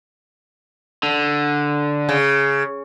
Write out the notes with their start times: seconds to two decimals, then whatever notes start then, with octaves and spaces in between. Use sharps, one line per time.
1.03 D3
2.09 C#3